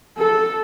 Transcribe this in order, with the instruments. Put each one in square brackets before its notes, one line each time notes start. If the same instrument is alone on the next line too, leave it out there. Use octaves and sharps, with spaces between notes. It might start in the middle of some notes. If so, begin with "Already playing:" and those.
[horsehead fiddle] A4